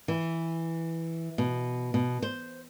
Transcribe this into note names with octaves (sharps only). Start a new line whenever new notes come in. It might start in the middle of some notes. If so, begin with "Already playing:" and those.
E3
B2
B2
C5